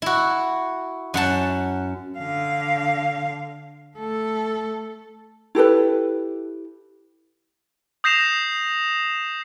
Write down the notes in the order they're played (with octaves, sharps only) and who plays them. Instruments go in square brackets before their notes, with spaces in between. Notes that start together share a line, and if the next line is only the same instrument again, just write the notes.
[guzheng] E4 F#4
F#2 F#5 A5
[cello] D3 F5
A3 A4
[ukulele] E4 G4 A4 B4
[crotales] D#6 G6 A#6 C7 E7 F7